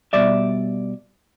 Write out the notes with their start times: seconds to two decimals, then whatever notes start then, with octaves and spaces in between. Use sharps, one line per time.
0.13 B2 G3 D5 E5